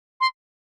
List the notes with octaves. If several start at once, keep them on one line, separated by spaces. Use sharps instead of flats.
C6